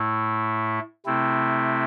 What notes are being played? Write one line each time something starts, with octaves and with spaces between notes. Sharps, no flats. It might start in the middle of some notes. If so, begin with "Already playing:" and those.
Already playing: A2 A3 E4
C3 A3 C4 E4